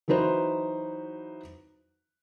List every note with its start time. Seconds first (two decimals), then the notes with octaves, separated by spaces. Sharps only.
0.08 E3 F#3 D#4 B4 C5